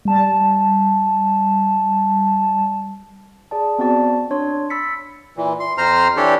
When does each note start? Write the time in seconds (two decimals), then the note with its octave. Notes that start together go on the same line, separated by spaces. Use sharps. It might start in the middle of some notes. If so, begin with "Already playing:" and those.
0.05 G3 A5
3.51 G#4 D5 A5
3.79 B3 C4 F#4 D5 A5
4.31 D4 C#5 C6
4.70 B5 E6 A6 B6 C#7
5.37 A#2 E3
5.60 C6
5.78 F2 C5 A#5 C6 F6
6.17 E3 D4 G4 A4 C#5